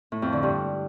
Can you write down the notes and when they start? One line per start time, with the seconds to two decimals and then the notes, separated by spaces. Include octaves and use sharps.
0.12 A2
0.22 F2
0.33 D3
0.43 G2